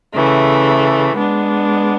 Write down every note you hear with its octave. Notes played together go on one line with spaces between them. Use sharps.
C#3 E3 A3
G#3 B3 D4